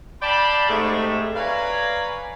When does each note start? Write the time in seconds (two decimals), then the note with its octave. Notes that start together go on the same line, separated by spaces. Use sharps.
0.22 D5 F5 G5 A5 B5
0.69 G#2 C3 G#3 A3
1.36 B4 C#5 D5 F5 G#5 A#5